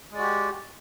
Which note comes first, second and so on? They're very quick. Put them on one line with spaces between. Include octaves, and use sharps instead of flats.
G#3 D5 F#4 G4